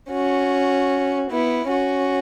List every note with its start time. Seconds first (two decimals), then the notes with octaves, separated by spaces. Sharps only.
0.10 C#4 F#4
1.30 B3 E4
1.70 C#4 F#4